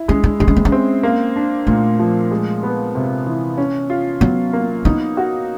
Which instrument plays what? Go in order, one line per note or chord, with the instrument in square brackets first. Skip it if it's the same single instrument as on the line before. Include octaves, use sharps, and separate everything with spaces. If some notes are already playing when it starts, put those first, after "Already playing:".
Already playing: [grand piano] E4
[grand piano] G#3 [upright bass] C#4
[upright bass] D4
[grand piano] G#3 [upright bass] D4
[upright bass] C#4
C4
C#4
[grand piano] C4
A#3
D4
[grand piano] A#2 [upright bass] A3
[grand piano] F3
G#3
B3
C3
E3
C#4
F4
[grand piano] F#3 [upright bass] B3
[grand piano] A#3
[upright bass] B3 [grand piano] D#4
[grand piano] F#4